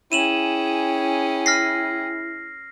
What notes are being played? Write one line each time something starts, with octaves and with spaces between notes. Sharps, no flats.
C#4 E4 G#4 G5 D#7 E7 F#7
F6 A#6 C7